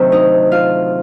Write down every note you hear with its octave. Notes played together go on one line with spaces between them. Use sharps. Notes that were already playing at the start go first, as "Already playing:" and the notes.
Already playing: D2 C3 D#3 F#3
D#4 D#5
F4 F5